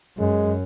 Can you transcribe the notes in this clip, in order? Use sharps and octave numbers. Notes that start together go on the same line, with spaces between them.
F#2 G#3